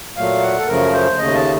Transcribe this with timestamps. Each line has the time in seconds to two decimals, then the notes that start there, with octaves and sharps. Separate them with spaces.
0.17 A#2 F#3 A3 F5
0.42 F#5
0.59 A4
0.67 F#2 C#3 F3 A3 A#4
0.93 C5
1.18 D#2 C#3 A3 D#5
1.35 A5